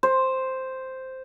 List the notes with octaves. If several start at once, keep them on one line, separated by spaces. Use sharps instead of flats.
C5